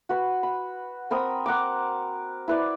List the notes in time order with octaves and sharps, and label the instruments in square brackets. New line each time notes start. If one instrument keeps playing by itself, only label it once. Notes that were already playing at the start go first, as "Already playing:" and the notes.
[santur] F#4 B4
B5
C4 A#4 B5 D#6
A#4 F#5 A#5 D6
E4 B4 D5